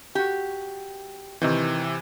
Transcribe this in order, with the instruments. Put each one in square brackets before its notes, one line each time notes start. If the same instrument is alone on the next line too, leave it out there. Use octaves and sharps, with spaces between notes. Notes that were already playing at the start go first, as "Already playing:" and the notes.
[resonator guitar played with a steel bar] F#4 G4
[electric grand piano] C3 E3 [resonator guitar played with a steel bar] D#3 C4